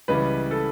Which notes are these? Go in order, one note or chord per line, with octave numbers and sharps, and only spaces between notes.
C#2 C#3 E3 G3 B4
A4